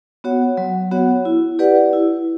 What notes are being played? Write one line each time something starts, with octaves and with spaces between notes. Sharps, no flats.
B3 F#4 C#5 F#5
F#3
B3 F#4 C#5 F#5
E4
G4 B4 D5 F#5
E4